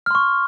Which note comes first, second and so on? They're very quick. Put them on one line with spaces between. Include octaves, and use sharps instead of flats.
F6 C6 C#6